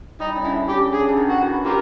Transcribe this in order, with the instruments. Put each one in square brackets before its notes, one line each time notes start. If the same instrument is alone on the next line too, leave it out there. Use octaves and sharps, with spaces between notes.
[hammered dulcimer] G3 [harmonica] D#4
[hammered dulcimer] C#3
[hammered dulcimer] D3 [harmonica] E4
[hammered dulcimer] C#3 [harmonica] G4
[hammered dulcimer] D3 [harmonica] G#4
[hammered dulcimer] C#3
D3
D#3
[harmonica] F#4
[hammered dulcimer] E3
[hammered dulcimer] D#3 [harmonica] F4 G4 A#4